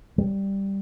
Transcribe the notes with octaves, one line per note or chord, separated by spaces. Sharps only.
G3